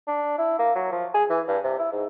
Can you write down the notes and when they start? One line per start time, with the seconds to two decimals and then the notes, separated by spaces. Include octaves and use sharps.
0.07 D4
0.38 E4
0.59 A#3
0.75 F#3
0.92 F3
1.14 G#4
1.30 E3
1.48 G2
1.64 C3
1.79 E4
1.92 G#2